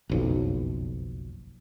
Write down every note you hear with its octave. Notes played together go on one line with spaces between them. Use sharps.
F#1 B1 F2